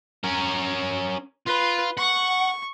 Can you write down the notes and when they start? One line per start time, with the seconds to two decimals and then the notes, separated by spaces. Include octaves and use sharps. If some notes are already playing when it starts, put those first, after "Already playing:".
0.24 C#4 A#4
1.46 F4 B4
1.97 F#5 C#6